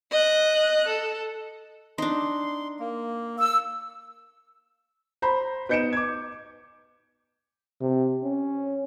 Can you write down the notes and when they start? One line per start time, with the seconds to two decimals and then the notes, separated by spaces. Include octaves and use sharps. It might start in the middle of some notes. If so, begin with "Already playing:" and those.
0.11 D#5 F#6
0.87 A4
1.98 D4 D#4 C6
2.80 A#3
3.39 E6
5.22 C5 A#5 B5
5.69 B3 D#4 G6 C#7 D7 E7
5.93 D6 G#6
7.81 C3
8.23 C#4